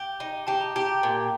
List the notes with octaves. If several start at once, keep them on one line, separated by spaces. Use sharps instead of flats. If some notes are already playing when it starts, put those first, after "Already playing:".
Already playing: G4
D#4
G4 A5
A#5
G4 A5
A#5
A#2